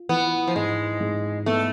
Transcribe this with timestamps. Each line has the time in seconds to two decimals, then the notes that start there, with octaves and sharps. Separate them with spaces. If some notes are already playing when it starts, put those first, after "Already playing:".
Already playing: F4
0.09 E3 B3
0.47 F3
0.56 G#2 G#3
1.00 G#2
1.46 A3 B3